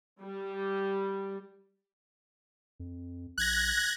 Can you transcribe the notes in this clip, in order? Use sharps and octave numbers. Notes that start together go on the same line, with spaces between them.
G3
F2
A#1 F#6 G#6 A#6